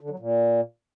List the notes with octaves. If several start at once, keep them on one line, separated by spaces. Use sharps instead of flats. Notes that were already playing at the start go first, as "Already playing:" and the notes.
D3
F#3
A#2